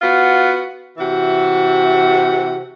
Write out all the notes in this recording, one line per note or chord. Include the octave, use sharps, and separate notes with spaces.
B3 F4 F#4
C3 E3 F#4